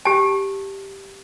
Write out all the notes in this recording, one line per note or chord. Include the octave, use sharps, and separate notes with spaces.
G4 A5